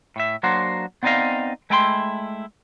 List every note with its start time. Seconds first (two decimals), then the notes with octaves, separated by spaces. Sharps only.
0.16 A2 E5
0.43 F#3 A#3 D4 F#4 C5
1.03 B3 C4 D#4 D5 D#5 F5
1.70 G#3 A3 E4 G5 A#5 C6